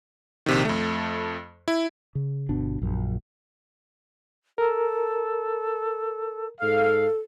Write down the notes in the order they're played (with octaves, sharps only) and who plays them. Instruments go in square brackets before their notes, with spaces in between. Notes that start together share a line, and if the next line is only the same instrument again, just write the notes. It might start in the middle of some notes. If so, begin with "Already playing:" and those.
[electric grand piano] A#1 C3 D#3
F2 A3
E4
[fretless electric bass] C#3
G1 B2 D4
A#1 F#2
[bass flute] A4 [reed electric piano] A#4
[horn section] G#2 F5 [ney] A4